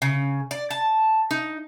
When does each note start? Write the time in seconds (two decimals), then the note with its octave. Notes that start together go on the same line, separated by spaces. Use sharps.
0.02 C#3
0.51 D5
0.71 A5
1.31 D#4